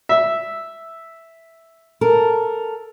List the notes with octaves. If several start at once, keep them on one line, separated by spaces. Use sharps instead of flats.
E5
A4 A#4